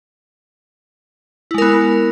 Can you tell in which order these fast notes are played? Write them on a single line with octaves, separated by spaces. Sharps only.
E4 G#3 A#4 B3